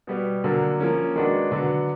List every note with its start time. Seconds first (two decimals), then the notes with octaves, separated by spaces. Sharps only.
0.07 B2 G3 B3
0.44 D3 F#3 A#3
0.80 F3 A#3 C#4
1.16 D#3 G#3 B3 D4 F#4
1.52 D3 F#3 B3